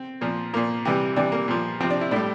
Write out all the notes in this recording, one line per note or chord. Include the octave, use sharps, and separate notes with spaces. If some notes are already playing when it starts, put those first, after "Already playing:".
Already playing: C4
A#2 F3
A#2 F3 A#3
C3 E3 G3
C3 E3 G3 D4
A#3
A#2 F3
C3 F3 C4
D4
E4
A2 G3 D4